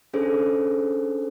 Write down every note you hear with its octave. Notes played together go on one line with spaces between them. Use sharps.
C#4 D4 G#4 A4 C5